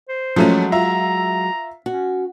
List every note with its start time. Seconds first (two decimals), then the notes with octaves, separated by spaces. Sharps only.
0.09 C5
0.36 F3 F#3 G#3 A3 C#4
0.72 F4 E5 A#5
1.86 C#4 F#4